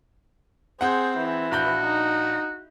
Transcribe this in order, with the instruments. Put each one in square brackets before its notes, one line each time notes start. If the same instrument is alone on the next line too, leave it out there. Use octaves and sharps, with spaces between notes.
[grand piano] C4 F#5 [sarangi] G#4 [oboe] C5
[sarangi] E3
[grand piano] A#1 B5 G6 [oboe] F#4
[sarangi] D#4